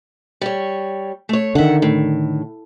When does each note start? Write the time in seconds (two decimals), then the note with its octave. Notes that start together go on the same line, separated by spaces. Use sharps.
0.41 G3 C#5
1.29 A3 C#5
1.55 D3 D#3 E5 F#5
1.82 A2